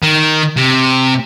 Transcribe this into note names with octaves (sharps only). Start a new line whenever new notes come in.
D#3
C3